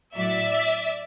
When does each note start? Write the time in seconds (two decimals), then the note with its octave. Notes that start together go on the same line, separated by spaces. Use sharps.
0.15 A2 F#3 D5 E5